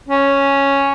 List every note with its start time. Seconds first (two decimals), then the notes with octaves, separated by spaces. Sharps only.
0.08 C#4